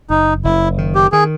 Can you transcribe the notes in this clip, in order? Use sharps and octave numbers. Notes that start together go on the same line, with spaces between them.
F#1 D#4
F#1 E4
D#3
G4
D#3 G#4